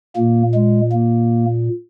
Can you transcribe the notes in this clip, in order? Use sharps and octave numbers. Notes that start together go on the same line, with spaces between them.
A#2 A#3
G#3
A#3